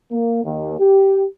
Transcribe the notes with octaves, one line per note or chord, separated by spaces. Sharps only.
A#3
D#2
G4